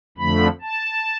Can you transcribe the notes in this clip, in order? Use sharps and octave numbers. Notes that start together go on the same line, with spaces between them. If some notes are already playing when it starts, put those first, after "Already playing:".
F2 D3 F3 A3 B5
A5